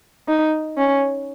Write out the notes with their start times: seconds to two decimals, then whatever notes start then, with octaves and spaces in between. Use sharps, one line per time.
0.28 D#4
0.77 C#4